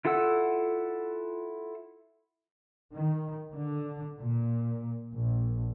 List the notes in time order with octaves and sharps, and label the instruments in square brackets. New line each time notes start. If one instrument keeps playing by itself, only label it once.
[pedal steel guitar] E4 F4 A4 F#5 E6
[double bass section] D#3
D3
A#2
A#1